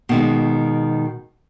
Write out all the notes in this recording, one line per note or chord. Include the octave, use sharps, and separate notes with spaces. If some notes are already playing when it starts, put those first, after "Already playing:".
B2 D#3 G#3